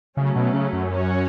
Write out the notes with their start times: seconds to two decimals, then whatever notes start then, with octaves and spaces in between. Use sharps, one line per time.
0.17 C#3 F#3 A3 C#4
0.36 B2
0.53 C#3
0.73 F#2
0.92 C#4 F#4 C#5